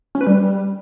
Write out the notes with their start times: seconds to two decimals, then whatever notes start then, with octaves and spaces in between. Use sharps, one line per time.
0.15 C#4
0.21 B4
0.27 G3